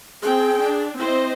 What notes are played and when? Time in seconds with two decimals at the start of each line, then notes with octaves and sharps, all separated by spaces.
0.23 C4 G#4 G5
0.61 D4
0.98 C4 E4 C5 D#5